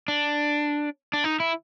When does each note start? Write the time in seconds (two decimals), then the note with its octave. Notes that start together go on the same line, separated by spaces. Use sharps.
0.08 D4
1.13 D4
1.24 D#4
1.40 E4